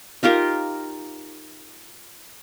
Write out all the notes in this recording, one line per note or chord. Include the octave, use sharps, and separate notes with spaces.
D#4 F4 G4 A#4